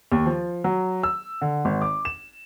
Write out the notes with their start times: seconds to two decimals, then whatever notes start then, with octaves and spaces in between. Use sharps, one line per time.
0.12 D#2
0.26 F3
0.64 F#3
1.03 E6
1.42 D3
1.65 G#1
1.81 D6
2.05 E7